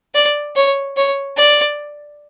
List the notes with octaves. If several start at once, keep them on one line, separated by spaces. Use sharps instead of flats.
D5
C#5
C#5
D5